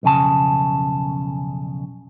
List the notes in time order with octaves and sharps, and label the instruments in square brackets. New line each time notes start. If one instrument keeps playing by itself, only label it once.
[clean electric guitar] B1 F2 C#3 G#5 A5